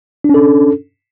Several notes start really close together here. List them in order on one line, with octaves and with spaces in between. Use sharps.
D4 C#4 A4